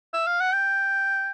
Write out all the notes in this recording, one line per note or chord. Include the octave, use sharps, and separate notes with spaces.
E5
F5
F#5
G5